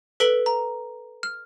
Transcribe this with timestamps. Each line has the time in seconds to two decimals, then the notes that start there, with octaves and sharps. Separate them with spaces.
0.20 A4 B4 B6 D7 F#7 G7
0.46 A#5
1.23 F6